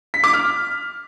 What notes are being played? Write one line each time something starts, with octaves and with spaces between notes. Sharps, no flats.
B6
D6
F6